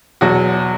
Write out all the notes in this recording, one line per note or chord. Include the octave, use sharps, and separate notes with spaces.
E2 B2 F#3 F#4